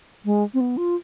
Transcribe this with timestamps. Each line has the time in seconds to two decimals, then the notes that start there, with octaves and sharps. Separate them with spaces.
0.25 G#3
0.54 C4
0.60 B3
0.77 F4